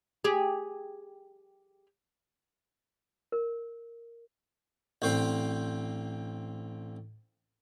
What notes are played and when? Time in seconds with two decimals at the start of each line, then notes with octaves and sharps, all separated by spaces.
0.24 G4 G#4
3.32 A#4
5.02 A1 D3 C4 C5